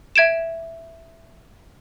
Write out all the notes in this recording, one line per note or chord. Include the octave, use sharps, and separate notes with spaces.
E5 G#6 D7 E7